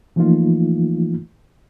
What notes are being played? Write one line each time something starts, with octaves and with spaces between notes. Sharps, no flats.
E3 F3 A3 A#3 D#4 F4